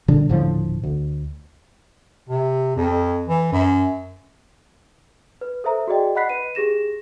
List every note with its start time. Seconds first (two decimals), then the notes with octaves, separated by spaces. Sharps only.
0.08 A#2 D3 G3 D4
0.29 D#1 A2 D3 F3
0.83 D2
2.29 C3
2.76 F2
3.28 E3
3.52 F#2
5.41 B4
5.64 A4 C5 E5 A#5
5.87 F#4 G#4 D5 D#5 G5
6.15 D#5 F#5 B5 F#6 B6 C7
6.29 B4 D#7
6.55 G4 G#4 A#6 E7